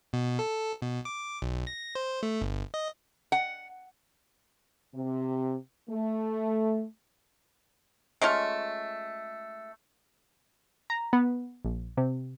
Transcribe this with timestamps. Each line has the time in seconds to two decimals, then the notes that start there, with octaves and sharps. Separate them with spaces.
0.13 B2
0.39 A4
0.82 B2
1.05 D6
1.42 B1
1.67 A#6
1.95 C5
2.23 A3
2.41 G1
2.74 D#5
3.32 F#5
4.95 C3
5.90 A3
8.21 G#3 A3 C#4 F4
10.90 A#5
11.13 B3
11.65 A#1
11.97 C3